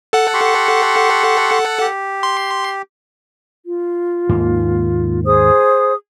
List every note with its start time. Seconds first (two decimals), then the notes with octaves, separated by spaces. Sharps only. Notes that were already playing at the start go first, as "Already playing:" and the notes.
0.13 A4 F#5
0.34 G4 C6 C#6
1.81 G4
2.23 C6
3.66 F4
4.29 D#2 G#2 A#3
5.25 G#4 C5 D#6